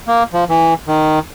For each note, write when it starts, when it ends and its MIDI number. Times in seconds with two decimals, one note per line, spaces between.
0.07 0.23 58
0.33 0.45 53
0.49 0.74 52
0.87 1.19 51